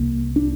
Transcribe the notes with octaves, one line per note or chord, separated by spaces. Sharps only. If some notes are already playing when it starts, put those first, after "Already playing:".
Already playing: C2 C3 A#3
D4